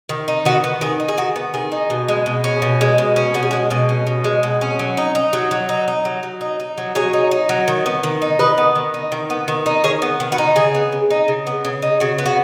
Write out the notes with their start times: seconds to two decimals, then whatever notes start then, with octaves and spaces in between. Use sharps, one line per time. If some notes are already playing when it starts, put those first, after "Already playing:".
0.09 D#3
0.28 D#4
0.45 D#3 F#4 B4
0.64 B3
0.81 D#3 G#4
1.00 D#4
1.08 G#4
1.18 D#3 F#4
1.36 B3
1.54 D#3 G#4
1.72 D#4
1.90 B2
2.08 G#3
2.26 B2
2.44 C#4
2.62 B2
2.81 G#3
2.98 B2
3.16 C#4
3.34 B2 F#4
3.43 G#4
3.51 G#3 F#4
3.70 B2 G#4
3.89 C#4
4.07 B2
4.24 G#3
4.43 B2
4.61 C#4
4.79 F#3
4.97 D#4
5.15 D#4
5.33 F#3
5.51 F#3
5.69 D#4
5.88 D#4
6.05 F#3
6.23 F#3
6.41 D#4
6.60 D#4
6.78 F#3
6.95 F#3 G#4 C#5
7.13 D#4
7.31 D#4
7.49 F#3
7.68 D#3
7.86 B3
8.03 D#3
8.22 D#4
8.39 D#3 B4 D#5
8.58 B3
8.75 D#3
8.94 D#4
9.12 D#3
9.30 B3
9.48 D#3
9.66 D#4
9.84 D#3 G#4 C#5
10.02 B3
10.20 D#3
10.32 F#4 B4
10.38 D#4
10.56 C#3 G#4
10.75 B3
10.92 C#3
11.10 D#4
11.28 C#3
11.47 B3
11.65 C#3
11.82 D#4
12.00 C#3 F#4
12.18 B3
12.26 F#4